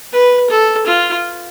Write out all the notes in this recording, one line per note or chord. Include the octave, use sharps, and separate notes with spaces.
B4
A4
F4